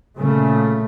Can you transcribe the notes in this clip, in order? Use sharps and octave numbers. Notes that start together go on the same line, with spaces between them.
A#2 C#3 A3